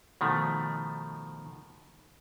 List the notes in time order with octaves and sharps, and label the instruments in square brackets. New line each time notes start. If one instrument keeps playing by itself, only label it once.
[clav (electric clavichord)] B2 D#3 F3 A3